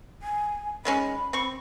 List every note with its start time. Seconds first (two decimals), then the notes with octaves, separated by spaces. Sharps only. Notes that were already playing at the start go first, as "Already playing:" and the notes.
0.22 G#5
0.85 D#3 G#3 C#4 B5
1.33 C4 C#6